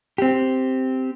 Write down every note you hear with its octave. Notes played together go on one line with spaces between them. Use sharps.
C4 G4